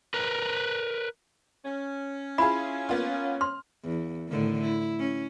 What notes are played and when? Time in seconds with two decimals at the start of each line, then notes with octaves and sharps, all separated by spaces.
0.14 A#4 B4
1.65 C#4
2.38 E4 F4 G#4 B5
2.89 A#3 B3 F4
3.41 C6 F6
3.84 E2
4.28 A2 D3 D#3
4.61 E4
4.99 C#4